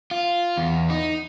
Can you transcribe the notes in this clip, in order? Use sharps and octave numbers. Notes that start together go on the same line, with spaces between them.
F4
E2
D#4